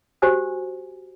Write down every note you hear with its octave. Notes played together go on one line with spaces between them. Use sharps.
F#4 G4 C5 G#5 E6